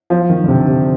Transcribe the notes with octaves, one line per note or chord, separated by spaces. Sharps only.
F3
D#3
D3
C3
C3